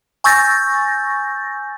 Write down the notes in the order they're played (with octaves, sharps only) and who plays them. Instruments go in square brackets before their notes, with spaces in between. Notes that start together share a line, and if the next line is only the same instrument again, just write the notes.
[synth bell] G#5 C#6 E6 G6 A6 A#6